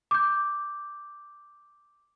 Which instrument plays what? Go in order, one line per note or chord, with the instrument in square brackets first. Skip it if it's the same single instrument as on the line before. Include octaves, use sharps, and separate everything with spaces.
[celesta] D6 G6